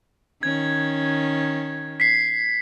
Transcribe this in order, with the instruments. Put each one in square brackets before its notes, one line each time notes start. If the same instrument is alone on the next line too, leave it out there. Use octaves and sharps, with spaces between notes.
[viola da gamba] D#3 C#4 [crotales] G#6
[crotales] B6 C7